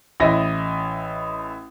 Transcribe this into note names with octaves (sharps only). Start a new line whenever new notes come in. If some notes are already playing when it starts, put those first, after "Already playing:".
A1 E4 D#5 A#6